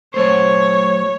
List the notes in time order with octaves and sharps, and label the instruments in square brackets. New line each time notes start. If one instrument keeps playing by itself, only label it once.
[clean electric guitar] F#3 A3 C5 [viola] C#5